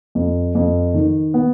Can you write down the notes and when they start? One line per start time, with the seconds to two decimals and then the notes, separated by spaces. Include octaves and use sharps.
0.15 F2
0.55 F2
0.94 D#3
1.34 B3